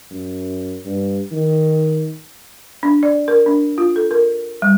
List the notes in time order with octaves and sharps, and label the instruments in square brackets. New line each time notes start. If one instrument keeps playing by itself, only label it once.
[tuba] F#2
G2
D#3
[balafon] D4
D5
A#4
D4
F4
A4
A#4
G3